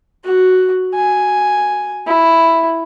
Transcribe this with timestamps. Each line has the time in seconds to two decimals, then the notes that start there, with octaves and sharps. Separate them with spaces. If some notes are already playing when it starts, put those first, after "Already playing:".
0.25 F#4
0.94 G#5
2.07 E4